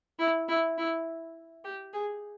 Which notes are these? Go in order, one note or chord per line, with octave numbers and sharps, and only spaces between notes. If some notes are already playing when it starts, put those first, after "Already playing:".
E4
E4
E4
G4
G#4